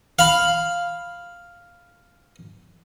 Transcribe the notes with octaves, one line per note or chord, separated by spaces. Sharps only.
F5 B5